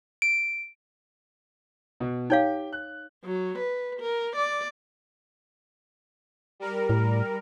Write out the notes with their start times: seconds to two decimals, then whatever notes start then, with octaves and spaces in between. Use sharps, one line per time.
0.22 D7
2.00 B2
2.30 D#4 G4 C#5 F5 G5
2.73 F#6
3.25 F#3
3.58 B4
4.00 A#4
4.36 D5
6.60 G3 A#4
6.90 A2